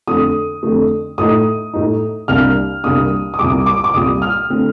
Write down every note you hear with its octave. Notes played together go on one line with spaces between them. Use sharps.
F2 D3 A3 D#6
F2 D3 A3
A2 A3 D#4 D#6
A2 A3 D#4
C2 C3 G3 A#3 D4 F6
C2 C3 G3 A#3 D4 D#6
D#6
C2 A#2 G3 D6
D6
D6
C2 A#2 G3 D#6
F6
D3 A3 C4